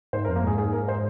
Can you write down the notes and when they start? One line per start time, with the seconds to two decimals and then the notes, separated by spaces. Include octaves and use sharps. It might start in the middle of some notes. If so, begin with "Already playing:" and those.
0.13 G#2 C5
0.25 A#4
0.29 F2
0.36 A#3
0.43 G#2 G#4
0.58 G#4
0.73 A#4
0.88 C5